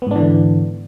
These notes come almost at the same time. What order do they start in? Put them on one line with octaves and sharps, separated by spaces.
B3 G#2 D4 E3 D3